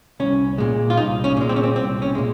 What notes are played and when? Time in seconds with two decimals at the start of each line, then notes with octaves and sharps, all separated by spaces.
0.20 C2 C#4
0.58 A#2 G#3
0.90 F4
0.97 C2 D#4
1.24 C#4
1.37 A#2 G#3
1.49 C4
1.56 C#4
1.63 C4
1.75 C2 C4
2.02 C#4
2.15 A#2 G#3